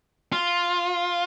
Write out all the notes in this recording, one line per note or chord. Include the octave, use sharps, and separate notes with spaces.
F4